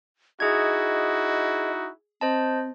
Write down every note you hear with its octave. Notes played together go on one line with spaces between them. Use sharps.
D#4 E4 F#4 G#4 D#5 G#6
C4 C5 D#5 A5